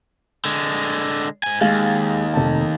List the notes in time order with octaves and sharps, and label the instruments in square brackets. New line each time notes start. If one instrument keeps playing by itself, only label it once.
[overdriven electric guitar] D3 G#3
G#2 G#5
[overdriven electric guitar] D#2 [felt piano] G#3 F5
[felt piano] F1 A5